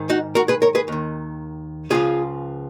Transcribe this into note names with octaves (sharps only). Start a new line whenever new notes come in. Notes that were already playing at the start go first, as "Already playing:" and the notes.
Already playing: G#2 D#3
D#4 F#4
F#4 A#4
G#4 B4
A#4 C#5
G#4 B4
D#2 D#3
C#2 C#3 F3 F4 G#4